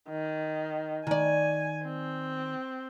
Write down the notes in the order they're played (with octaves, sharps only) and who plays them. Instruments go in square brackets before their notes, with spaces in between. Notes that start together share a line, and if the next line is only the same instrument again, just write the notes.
[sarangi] D#3
[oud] D#3 D5 [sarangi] G#5
[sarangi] C4